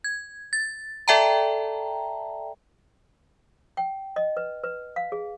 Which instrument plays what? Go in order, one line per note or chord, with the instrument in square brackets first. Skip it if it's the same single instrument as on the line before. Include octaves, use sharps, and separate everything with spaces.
[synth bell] G#6
A6
A4 D5 E5 G5 A5 A#5
[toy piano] G5
D#5
B4
B4
F5
G#4